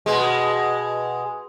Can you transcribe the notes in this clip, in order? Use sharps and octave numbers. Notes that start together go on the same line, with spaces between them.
B2 G#3